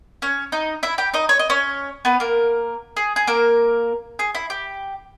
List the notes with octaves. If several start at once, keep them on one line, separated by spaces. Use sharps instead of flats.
C#4 C#5
D#4 D#5
E4 E5
G4 G5
D#4 D#5
C#5
D#5
C#4 C#5
B3 B4
A#3 A#4
G#4
G#4
A#3 A#4
G#4
E4
G4